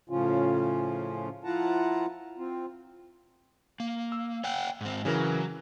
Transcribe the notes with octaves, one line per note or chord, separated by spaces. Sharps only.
A2 C#3 F3 C#4 F4
F3 E4 F4 F#5 A5 A#5
C4 F4
A#3
E6
C#5 F#5 G5
G#2 C4
C#3 E3 F#3 A#4